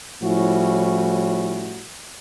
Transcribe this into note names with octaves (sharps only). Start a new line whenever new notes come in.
A2 F3 G3 C#4 E4 F#4